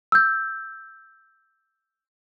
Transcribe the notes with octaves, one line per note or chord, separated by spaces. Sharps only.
E6 G6